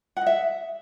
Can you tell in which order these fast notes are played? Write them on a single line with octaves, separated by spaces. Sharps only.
F#5 D#5 E5